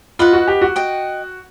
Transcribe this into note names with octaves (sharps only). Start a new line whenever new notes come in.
F4 B4 D#5 F#5
F#4
G4
F#4
D#5 G5